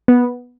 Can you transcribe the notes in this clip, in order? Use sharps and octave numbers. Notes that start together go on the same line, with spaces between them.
B3